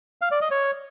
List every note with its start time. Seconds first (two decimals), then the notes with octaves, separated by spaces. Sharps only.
0.21 F5
0.31 D5
0.41 D#5
0.51 C#5